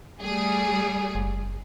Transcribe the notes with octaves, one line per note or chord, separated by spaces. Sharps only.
G3 A3 G#4
F#1